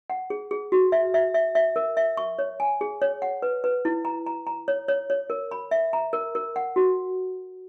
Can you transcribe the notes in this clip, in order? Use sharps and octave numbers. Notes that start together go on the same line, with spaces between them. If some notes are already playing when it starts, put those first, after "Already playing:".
F#5
G#4
G#4
F#4
E5
E5
E5
E5
A#4
E5
C#6
C#5
G#5
G#4
C#5
F#5
B4
B4
E4
A#5
A#5
A#5
C#5
C#5
C#5
A#4
B5
E5
A#5
A#4
A#4
F#5
F#4